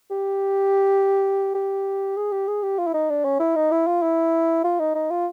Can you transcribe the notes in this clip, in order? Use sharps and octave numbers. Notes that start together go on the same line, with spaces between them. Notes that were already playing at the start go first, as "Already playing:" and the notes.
G4
G4
G#4
G4
G#4
G4
F4
E4
D#4
D4
C#4
E4
D#4
E4
F4
E4
F4
D#4
D#4
F4